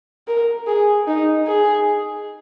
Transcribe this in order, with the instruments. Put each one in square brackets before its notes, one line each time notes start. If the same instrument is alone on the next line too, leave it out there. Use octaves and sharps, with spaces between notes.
[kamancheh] A#4
G#4
D#4
G#4